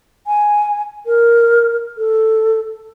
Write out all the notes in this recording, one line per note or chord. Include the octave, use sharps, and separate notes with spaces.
G#5
A#4
A4